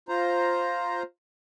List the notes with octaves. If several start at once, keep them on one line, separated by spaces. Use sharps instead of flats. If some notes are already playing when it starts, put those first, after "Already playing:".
F4 C5 A#5